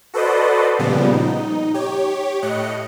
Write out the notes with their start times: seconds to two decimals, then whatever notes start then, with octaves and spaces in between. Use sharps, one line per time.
0.14 F#4 A4 B4 C5 D5 D#5
0.79 A#2 C#3 F3 G3 B3
1.12 D#4
1.74 G4 C#5
2.42 A2 D#5 F#6 C#7